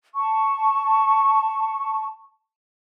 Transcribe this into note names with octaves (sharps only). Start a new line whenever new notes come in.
A5 C#6